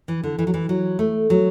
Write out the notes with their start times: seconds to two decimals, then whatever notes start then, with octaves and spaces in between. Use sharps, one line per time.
0.08 E3
0.23 D3
0.39 E3
0.47 F#3
0.54 E3
0.69 F#3
0.99 A3
1.30 F#3